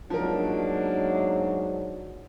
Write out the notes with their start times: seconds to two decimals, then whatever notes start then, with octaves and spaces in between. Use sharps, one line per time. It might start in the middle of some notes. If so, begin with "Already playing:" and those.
0.10 G#2 F3 F#3 A#3 B3 D4 A#4